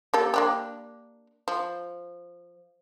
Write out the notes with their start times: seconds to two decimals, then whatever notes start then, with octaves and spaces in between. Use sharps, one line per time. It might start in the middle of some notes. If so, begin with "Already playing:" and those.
0.14 A#3 G4 A4
0.34 A#3 D4 G4
1.48 F3